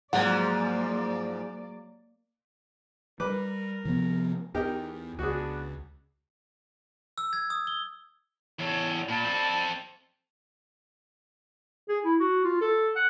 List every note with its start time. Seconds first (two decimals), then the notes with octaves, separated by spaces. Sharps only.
0.13 G#2 F3 F#3 G#3 A#3 D5 F#5
3.20 G3 A#4 B4 D6
3.85 C3 F3 B3
4.54 E2 D#4 G4 A#4
5.19 C#2 B3 D4 F#4 G#4
7.18 E6
7.33 G#6
7.50 D#6
7.67 G7
8.59 E2 A4 C#5
9.09 A#2 D5 A5 B5
9.23 C4 A4
11.89 G#4
12.04 E4
12.19 F#4
12.44 F4
12.61 A4
12.95 F#5